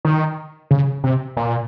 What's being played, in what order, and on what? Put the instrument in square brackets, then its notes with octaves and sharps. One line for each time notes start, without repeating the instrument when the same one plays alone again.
[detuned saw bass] D#3
C#3
C3
A#2